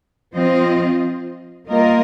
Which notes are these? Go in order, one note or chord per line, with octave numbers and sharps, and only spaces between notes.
F3 C4 F4 C5 D#5
G3 A#3 F4 A#4 D#5